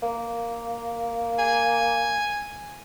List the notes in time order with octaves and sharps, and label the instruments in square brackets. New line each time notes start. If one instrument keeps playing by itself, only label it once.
[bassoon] A#3
[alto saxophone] G#5